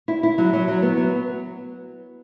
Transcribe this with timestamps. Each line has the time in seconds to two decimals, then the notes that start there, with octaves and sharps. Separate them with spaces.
0.08 E4
0.23 E4
0.38 F#3
0.53 F#3
0.68 F#3
0.82 B3
0.97 F#3